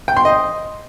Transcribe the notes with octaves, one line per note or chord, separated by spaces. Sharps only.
G5
C6
D#5